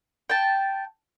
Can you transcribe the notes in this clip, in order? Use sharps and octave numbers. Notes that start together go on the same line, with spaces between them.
G5 A5